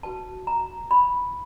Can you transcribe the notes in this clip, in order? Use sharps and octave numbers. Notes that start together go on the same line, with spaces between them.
F#4 B4 A5
A#5
B5